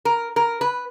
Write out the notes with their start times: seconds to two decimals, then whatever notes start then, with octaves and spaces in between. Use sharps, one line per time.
0.05 A#4
0.36 A#4
0.61 B4